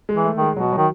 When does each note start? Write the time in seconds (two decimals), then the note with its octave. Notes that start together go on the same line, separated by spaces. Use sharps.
0.09 G#3
0.15 E3
0.24 A3
0.35 D#3
0.41 G#3
0.56 B2 F#3
0.72 D#3 F#3